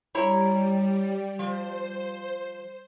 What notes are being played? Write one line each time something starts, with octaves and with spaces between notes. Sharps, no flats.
G3 E4 C#5 A#5
F3 C5